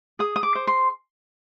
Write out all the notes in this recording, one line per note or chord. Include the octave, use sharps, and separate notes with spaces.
G#4 D#6
D#6
D6
C5
C6